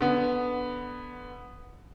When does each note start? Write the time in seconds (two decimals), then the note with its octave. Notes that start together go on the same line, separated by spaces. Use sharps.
0.01 D3 B3